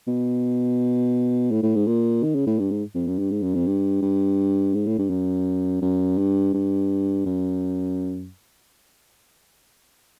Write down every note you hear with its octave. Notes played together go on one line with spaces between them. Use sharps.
B2
A2
A2
G#2
A#2
D#3
C#3
A2
G2
G#2
F2
F#2
G2
G#2
F#2
F2
G2
G2
G#2
A2
G2
F#2
F#2
G2
G2
F#2